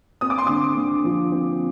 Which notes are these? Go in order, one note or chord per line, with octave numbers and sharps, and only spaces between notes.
C4 D#6
D6
C6
D3 D6
D3
F3
C4